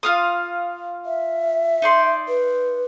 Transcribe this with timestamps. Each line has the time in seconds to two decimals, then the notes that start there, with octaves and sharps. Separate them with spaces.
0.03 F4 F5 D#6
1.06 E5
1.82 D#4 D5 C6
2.28 B4